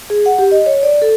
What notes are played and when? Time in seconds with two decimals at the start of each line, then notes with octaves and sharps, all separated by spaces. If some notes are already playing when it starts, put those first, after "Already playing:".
0.10 G#4
0.26 F#5
0.39 G4
0.52 D#5
0.66 C#5
0.83 D5
1.02 A4